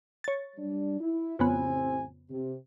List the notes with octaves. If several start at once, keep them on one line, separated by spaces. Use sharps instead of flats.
C#5 A6
G3 D4
E4
A1 F2 C#3 B3 C4 G#5
C3